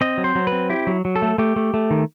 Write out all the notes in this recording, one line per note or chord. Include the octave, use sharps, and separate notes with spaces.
C4 D#5
F#3
C5
F#3
B4
C4
E4 G4
F#3
F#3
A4
A3
A3 G4
A3
A3
D#3